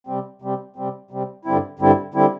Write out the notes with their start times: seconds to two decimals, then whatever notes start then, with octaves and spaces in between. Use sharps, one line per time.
0.07 C3 G3 C4
0.42 C3 G3 C4
0.76 C3 G3 C4
1.11 C3 G3 C4
1.45 G2 D3 G3 C4 E4
1.79 G2 D3 G3 C4 E4
2.14 D3 G3 C4 E4